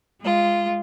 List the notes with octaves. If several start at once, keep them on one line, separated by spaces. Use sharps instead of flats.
G#3 F4